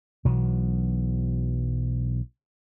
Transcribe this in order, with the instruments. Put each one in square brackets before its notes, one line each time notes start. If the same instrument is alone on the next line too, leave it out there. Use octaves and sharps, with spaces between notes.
[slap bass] B1 B2 E3 F#3